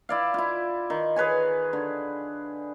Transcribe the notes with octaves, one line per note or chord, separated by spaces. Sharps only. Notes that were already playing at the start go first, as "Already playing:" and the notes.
E4 D5 F5
E4 F4
D#3
G#4 B4 C#5 G#5
D3